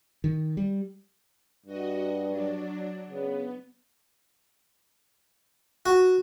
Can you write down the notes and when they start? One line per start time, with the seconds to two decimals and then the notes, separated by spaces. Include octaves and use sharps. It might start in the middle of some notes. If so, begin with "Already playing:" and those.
0.24 D#3
0.57 G3
1.66 G2 F#4 D#5
2.29 F#3 D4 D5
3.09 C#3 B3
5.86 F#4